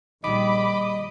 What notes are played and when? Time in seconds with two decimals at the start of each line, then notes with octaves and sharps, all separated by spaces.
0.24 A#1 D#3 G3 G4 D#5 B5 D6